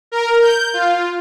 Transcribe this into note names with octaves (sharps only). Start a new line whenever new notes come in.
A#4
G6
F4